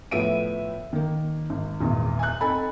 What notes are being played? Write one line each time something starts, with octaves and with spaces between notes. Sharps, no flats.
A2 F3 B3 E5 D7 D#7
D#3 A#3
G#1
G#1 E2 A#2
G#5 F#6
C4 D#4 A4 G#5 B5